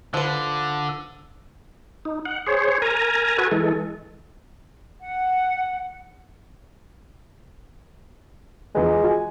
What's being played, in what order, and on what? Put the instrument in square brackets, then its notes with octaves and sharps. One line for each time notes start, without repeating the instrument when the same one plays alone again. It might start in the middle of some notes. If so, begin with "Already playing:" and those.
[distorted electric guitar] D3 [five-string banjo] F3 B4
[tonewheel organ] D#4
F#5
G#4 C5 C#5
A#4 G#5 A#5
F#4 A4 B4 G#5
E3 G#3 A4
[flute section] F#5
[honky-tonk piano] E2 F3 B4 [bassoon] G#3
[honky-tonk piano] F#4 G#5